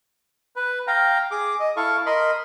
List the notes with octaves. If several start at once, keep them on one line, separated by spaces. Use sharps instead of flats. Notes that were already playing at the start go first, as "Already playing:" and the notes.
B4
F5 G5 A#5
G#4 D6
D#5
E4 A4 F5 C#6
A#4 D#5 B5 C6